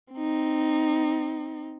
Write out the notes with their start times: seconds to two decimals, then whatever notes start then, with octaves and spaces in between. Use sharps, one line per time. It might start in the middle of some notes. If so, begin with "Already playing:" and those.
0.14 C4 D#4